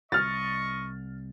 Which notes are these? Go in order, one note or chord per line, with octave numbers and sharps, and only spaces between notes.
C2 D#5 C#6 F6 A6